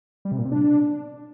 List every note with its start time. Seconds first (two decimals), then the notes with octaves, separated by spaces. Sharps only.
0.25 G3
0.32 C3
0.38 A#2
0.45 C3
0.52 D4